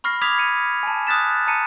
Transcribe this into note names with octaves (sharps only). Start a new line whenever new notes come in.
B5 C#6 F6 A#6 C7
B5 D6 D#6 G#6 B6 F7
C#7 D#7
G#5 A5
D#6 F6 F#6 A6 B6 E7
A5 A#5 C#7 D#7